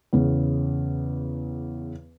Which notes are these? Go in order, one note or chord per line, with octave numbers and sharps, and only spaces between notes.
E2 C#3